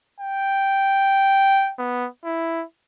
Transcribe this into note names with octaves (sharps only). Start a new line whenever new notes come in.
G5
B3
E4